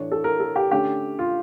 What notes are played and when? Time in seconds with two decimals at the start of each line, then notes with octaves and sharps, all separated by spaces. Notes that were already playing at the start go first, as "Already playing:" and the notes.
Already playing: A2 E3 A3 D4 C#5
0.12 A4
0.24 A#4
0.40 A4
0.56 G4
0.71 D3 A3 C#4 G4
1.19 F4